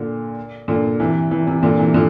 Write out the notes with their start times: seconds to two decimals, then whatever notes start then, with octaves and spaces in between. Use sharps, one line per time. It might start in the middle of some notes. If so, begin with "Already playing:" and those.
Already playing: A#2 D3
0.68 A#2 D3
1.00 C3 E3
1.31 C3 E3
1.47 C3 E3
1.63 A#2 D3
1.79 C3 E3
1.94 D3 F3